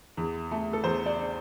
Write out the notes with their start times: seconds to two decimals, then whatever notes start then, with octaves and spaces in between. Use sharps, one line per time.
0.17 E2
0.51 A3
0.73 A4
0.84 E2 C5
1.06 D5